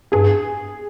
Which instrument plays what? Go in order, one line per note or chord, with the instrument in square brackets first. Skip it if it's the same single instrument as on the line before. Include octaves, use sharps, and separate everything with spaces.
[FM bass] G2 [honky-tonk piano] G#4